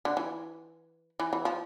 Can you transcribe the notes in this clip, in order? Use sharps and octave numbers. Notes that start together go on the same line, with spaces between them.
D3
E3
E3
E3
F3